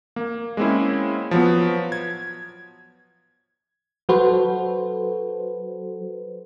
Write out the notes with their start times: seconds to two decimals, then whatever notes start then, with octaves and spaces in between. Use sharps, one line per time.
0.16 A#3
0.57 G#3 A#3 C4 C#4 E4
1.31 F3 F#3 B3
1.92 G#6
4.09 F#3 F#4 A4 B4 C5